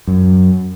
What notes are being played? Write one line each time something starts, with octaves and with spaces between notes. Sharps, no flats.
F#2